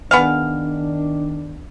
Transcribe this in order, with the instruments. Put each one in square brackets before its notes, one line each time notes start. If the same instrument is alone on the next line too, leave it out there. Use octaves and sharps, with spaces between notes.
[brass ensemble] D#3 D4 [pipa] B3 G#4 F5